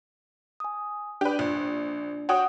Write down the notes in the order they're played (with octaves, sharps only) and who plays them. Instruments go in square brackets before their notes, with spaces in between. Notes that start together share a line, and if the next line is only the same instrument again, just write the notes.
[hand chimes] G#5 D#6
[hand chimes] D4 D5 [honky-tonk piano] G4 B4
[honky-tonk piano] A#1
[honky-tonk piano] F#4 C#5 G5 [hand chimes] F#5 D#6